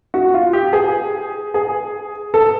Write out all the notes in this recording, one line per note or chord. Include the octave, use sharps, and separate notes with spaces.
F#4
F4
G4
G#4
G#4
A4